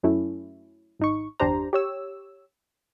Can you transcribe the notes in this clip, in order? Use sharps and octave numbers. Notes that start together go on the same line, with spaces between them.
F#2 F#3 A3 C#4 E4
G#1 D#4 C#6
G1 E2 D4 G4 C5 A#5
G4 C#5 E6